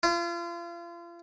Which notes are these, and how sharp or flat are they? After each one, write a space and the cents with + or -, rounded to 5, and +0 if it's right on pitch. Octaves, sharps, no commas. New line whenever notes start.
F4 -35